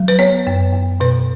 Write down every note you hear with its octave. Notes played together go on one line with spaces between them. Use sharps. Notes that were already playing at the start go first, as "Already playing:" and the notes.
Already playing: F#3
B4
B3 C#5
F#2
F#2
B2 B4